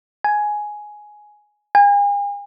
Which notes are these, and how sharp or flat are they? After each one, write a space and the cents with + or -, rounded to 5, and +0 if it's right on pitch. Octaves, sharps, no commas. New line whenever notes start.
G#5 +10
G#5 -40